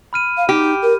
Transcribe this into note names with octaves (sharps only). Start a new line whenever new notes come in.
B5 F6 D#7
F5
D#4 G4
A#4